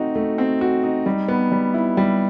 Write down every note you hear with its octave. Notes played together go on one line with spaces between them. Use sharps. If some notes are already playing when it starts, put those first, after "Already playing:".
Already playing: A3 C4 D#4 F#4
A3
C4
F#4
D#4
G3
B3
G3
E4
G3